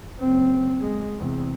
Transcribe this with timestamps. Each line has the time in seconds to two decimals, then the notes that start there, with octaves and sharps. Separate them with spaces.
0.19 F#1 C4
0.81 G#3
1.18 E2 C3